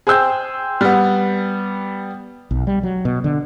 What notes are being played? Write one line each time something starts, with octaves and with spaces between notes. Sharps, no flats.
G#4 C5 G5 E6 G6
G3 B3
B1
G3
F#3
B2
D3